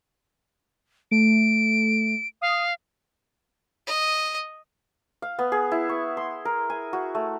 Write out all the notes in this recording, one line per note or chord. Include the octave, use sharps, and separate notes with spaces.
A3 D7
F5 D#6
D#5
F5
B3
G#4
E4
C#6
C6
A#4
G#5
F#4
A3